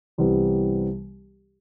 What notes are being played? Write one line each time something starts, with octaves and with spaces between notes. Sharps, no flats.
C2 C3 E3 G3 B3